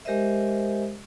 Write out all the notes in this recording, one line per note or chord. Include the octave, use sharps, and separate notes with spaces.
G#3 G4 A#4 C5 D#5 E5